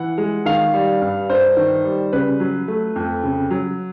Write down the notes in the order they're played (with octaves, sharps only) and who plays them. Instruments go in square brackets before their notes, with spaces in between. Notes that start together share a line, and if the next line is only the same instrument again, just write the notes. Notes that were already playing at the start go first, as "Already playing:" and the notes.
Already playing: [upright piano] E3 F#5
G#3
D#3 F5
G3
G2
G2 C5
D#3
G3
C#3 B4
F#3
A3
F2
C#3
F#3